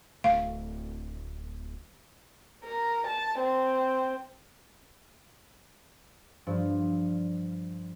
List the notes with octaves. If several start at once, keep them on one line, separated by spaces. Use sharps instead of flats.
D1 A3 F5
A#4
A5
C4
G2 F3